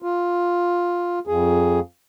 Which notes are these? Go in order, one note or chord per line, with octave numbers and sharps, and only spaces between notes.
F4
F2 G#4